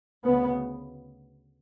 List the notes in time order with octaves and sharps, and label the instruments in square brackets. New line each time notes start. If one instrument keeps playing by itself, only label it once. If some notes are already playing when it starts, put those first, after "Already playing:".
[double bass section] D2 C#3 B3